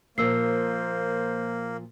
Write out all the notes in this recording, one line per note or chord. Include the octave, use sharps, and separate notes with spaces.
A#2 F3 A#3 A#4 C5 E6 C7